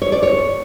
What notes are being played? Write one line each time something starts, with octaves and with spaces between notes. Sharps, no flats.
C#5
D5
C#5